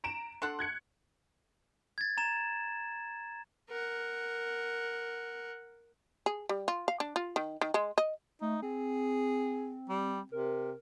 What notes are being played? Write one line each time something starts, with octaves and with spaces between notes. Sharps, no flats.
A#5 D7 E7
D4 A4 F#5 C6
F#6 G#6 C#7
G#6 A6
A#5 E7
A#4 F#5
G#4
G3
F4
F5
D4
F4
D#3
D#3
G#3
D#5
A3 D#4
C4 G#4
G3
C3 A#4